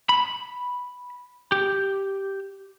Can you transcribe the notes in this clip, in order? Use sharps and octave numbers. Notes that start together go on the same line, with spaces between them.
B5
G4